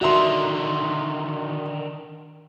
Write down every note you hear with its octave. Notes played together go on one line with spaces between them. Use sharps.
D3 D#3 F#4 E5 C6